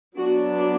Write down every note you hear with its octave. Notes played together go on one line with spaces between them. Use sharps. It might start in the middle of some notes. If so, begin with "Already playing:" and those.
F#3 B3 D4 F#4